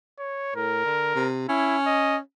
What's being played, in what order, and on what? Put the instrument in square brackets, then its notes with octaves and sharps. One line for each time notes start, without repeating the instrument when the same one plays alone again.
[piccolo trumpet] C#5
[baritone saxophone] A2 [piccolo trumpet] A#4
[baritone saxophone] D3
C3
[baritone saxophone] C#4 [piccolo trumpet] E4
[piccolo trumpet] D#5